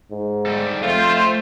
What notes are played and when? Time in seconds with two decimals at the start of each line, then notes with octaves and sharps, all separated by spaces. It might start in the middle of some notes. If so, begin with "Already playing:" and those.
0.12 G#2
0.46 G3 A4
0.83 F2 A3 F4 C5